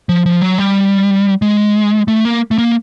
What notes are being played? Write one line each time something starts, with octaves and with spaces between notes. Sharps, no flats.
F3
F3
F#3
G3
G#3
A3
A#3
A3
A#3